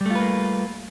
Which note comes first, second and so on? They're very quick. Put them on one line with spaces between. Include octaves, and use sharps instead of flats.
G3 A3 F4 B4 A#3